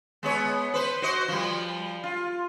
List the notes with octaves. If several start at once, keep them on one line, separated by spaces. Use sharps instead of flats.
G#3 B3 C#5
B4 C5
F#4 C5 D#5
F3 G3
F4